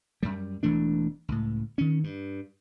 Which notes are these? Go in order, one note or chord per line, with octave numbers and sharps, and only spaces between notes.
F#2 G3
E1 E3 A3 D4
C#2 A2
D#3 C#4
G2